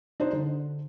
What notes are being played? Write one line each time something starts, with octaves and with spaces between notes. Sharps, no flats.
D4 D#4 C5
D3